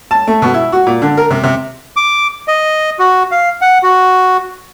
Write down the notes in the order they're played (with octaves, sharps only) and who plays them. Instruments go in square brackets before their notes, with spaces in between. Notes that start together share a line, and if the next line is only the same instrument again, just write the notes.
[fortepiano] A5
A3
B2
E4
F#4
A#2
D3
A#4
C3
C3
[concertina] D6
D#5
F#4
F5
F#5
F#4